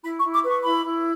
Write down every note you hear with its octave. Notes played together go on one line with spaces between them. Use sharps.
E4 B5
C#6
E4
D6
B4
C#6
E4 B5
E4